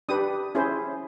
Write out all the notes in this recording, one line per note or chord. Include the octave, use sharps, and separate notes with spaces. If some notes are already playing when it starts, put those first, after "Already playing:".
D4 G4 B4 D#6
C#4 E4 G#4 C5